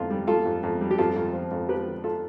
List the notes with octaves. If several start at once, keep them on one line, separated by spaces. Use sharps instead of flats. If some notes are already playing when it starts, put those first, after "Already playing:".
Already playing: F2 E3 F4 A4
G3
G3 F4 A4
F2
F2
G3
G4
F2 F4 A4
F2
F3
F2
F3 G4 B4
D3
F4 A4